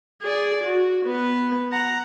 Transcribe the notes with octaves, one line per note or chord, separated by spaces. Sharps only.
G#4 D5
F#4
B3 B4
F#5 A#5